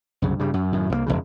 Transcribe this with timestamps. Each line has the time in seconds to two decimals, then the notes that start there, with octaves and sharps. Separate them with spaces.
0.22 C2 F#2 C#3
0.39 G2 C#3 G3
0.54 F#2
0.72 F#2 A2 D#3
0.89 C2 F3 A#3
1.06 E1 B1 F2 C#3